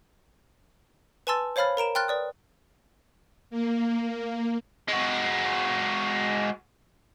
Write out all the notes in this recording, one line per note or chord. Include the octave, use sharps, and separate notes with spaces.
B4 G#5 A5 C6 E6 A6
C5 C#5 F5 B5 F6 A6
A#4 A#5 D7 E7
G5 C6 F6 F#6 A6
B4 D5 D#6
A#3
G#3 F#4